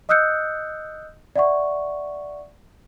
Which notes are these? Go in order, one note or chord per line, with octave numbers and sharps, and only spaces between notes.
D#5 D#6 E6 F#6 G6 C#7
D5 E5 F#5 C#6